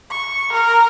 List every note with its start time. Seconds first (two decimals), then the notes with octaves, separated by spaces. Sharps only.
0.11 C#6
0.52 A#4